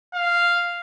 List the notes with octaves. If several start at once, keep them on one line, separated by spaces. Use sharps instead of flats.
F5